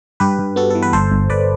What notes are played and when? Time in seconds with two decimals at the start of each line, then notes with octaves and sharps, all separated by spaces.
0.20 G2 G4 B4
0.39 G2
0.56 B3 F#4 A4
0.70 E3 A4
0.82 B4
0.93 G1 A4 C5
1.12 G1
1.30 G1 B4 D5